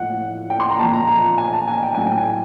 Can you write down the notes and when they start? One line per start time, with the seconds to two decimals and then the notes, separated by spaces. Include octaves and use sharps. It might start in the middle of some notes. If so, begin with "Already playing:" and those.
Already playing: A2 F3 F#5
0.50 G5
0.60 C6
0.70 A#5
0.79 A#2 F3 A5
0.94 A#5
1.09 A#5
1.38 G#5
1.53 A5
1.68 G#5
1.83 G5
1.94 A2 F#3 G#5
2.06 G5
2.18 G#5